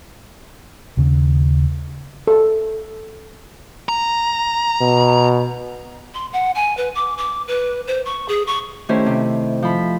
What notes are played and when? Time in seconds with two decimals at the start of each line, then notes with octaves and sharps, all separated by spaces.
0.97 D#2 C#3 C#4
2.27 A4
3.89 A#5
4.81 B2
6.14 C6
6.33 F#5
6.55 G#5
6.77 B4
6.95 D6
7.17 D6
7.47 B4
7.87 C5
8.05 C#6
8.28 G#4
8.47 C#6
8.89 D#3 A3 C#4 E4 G4 C5
9.06 C3
9.62 F3 B5